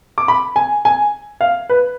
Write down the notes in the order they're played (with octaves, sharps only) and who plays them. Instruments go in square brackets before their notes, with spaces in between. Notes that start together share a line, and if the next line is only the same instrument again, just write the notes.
[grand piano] D6
B5
G#5
G#5
F5
B4